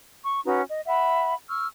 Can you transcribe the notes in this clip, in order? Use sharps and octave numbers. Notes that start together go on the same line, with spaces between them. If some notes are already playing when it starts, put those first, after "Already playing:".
C#6
C#4 D#4 F#4 B4
D#5
E5 F#5 B5
C#6 E6 F6